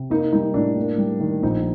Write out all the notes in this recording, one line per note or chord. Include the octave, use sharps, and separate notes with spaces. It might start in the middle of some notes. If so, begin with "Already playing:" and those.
Already playing: C3
A#3 D#4
G3 D#4
A2 D4
A#3
G3
D#3
A#1 D#4